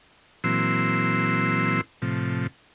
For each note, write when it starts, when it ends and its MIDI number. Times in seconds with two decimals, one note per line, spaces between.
0.44 1.81 46
0.44 1.81 52
0.44 1.81 54
0.44 1.81 60
0.44 1.81 84
0.44 1.81 88
2.02 2.47 45
2.02 2.47 48
2.02 2.47 53